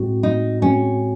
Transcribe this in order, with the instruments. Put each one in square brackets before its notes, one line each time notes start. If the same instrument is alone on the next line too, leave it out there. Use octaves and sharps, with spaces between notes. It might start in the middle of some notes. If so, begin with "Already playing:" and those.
Already playing: [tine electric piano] A2 G#3 C4 F#4
[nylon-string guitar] D#4
[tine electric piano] A2 G#3 C4 F#4 [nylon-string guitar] C#4